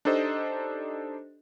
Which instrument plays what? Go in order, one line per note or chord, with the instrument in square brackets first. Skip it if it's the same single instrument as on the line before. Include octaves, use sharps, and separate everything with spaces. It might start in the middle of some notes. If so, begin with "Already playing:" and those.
[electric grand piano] D4 D#4 G4 A4 C5 D#5